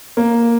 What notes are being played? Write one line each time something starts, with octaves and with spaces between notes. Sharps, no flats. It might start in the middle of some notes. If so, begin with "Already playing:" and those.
A#3